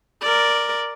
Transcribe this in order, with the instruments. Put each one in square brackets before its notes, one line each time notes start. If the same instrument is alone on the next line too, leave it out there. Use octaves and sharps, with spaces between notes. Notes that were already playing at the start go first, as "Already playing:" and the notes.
[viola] A#4 D5